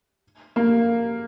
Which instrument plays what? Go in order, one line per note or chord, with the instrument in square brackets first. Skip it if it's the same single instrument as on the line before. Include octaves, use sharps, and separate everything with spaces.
[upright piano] A#3